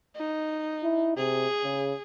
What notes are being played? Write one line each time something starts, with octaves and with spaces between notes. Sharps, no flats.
D#4
E4
C3 G#4
C#3